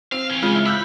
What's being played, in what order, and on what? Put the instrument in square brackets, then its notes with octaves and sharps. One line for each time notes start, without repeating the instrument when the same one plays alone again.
[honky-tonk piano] C4 [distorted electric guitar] F5
[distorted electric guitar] E3 C#4
[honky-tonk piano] C#3 F6 [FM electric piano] G#3 F4
[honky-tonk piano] E4
[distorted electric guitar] B5 [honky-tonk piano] E6 F#6 G6